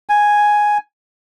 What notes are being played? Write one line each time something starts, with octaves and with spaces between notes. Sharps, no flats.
G#5